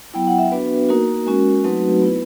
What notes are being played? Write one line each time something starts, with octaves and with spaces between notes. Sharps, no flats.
F#3 B3 E4 G5
F#5
E5
B3 D4 F#4 B4
A#3 D#4 F#4 A#4
G#3 C#4 F#4
F#3 A3 C4 D#4 F#4 B4
B3 E4